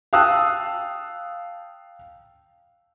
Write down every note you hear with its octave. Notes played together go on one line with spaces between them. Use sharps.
F5 G5 A5 D#6 E6 F#6